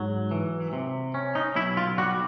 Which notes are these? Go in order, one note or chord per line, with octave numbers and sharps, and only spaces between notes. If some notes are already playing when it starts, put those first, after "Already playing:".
Already playing: G#2 F#3
E3
C3
C#4
D#4
B1 E4
F4
G3 F#4